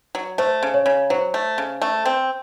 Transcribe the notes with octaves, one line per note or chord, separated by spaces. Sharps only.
F#3
A3 C5
C#3
C#5
C#3
F#3 C5
A3
C#3
A3
C4